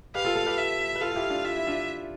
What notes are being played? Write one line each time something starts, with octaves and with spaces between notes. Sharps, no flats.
G4 B4 F5
F4 A4
F4 A4
G4 B4
E5
B4
F4 A4 F5
F4
E4 G4
D4 F4
F4 E5
E4
D4 F4